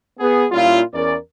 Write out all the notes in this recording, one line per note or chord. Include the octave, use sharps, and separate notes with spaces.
B3 G#4
A#2 G3 C#4 E4 F4
E2 C#4 A#4 D5